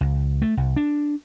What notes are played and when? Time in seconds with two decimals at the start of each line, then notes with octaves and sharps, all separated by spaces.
0.01 C#2
0.42 A3
0.57 C2
0.76 D4